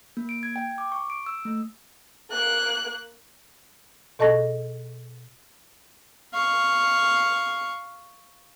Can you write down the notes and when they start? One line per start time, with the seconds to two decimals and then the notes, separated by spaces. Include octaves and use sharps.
0.17 A#3
0.29 D7
0.43 G#6
0.56 G5
0.78 D6
0.92 C#6
1.10 D7
1.26 E6
1.45 A3
2.31 A#3 F#6
4.19 B2 A4 D#5 A5 C#6 A#6
6.34 F5 C#6